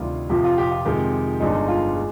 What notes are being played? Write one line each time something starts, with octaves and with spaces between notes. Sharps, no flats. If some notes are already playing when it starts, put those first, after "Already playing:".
Already playing: D2 C3 D#3 G3 F4
F1 F2 C3 F3 G4
F4
G4
F4
F2 C3 D#3 G#3 G4
G1 G2 D3 G#3 D#4
F4
G#3